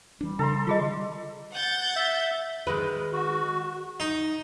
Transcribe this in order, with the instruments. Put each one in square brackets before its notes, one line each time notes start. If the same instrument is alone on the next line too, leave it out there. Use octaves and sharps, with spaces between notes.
[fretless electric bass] E3 D4 [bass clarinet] G3
[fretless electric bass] C#3 [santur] A4 A#5 C6
[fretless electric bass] D3 D#3 [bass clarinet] G3 [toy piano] F4 G#4 D#5
[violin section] F#5 G6 A6
[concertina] E5
[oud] D#3 G#3 B4
[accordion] F#4
[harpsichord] D#4